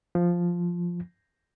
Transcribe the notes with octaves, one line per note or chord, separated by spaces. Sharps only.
F3